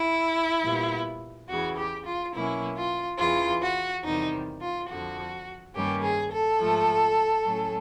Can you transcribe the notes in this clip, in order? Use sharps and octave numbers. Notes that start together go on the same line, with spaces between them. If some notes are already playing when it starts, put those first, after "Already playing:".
Already playing: E4
A#2 G3 B3
E2 C#3 E3 F#4
G4
F4
B2 F#3 A#3 C#4 E4
F4
E2 C#3 E3 F4
F#4
E2 C3 D#3 G3 D#4
F4
F2 D3 F3 F#4
G2 D#3 G3 A#3 C#4 G4
G#4
A4
G#2 F3 A3
A2 F#3 A3 C#4